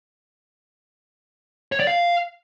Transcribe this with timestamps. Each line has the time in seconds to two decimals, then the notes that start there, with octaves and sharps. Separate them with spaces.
1.72 C#5
1.80 D5
1.87 F5